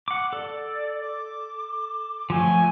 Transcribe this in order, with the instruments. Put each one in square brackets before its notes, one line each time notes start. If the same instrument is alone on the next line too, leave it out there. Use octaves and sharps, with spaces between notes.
[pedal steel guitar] F#5 D6
[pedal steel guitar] A4 [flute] D5
[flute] D6
[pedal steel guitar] F3 F#3 A3 [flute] G#5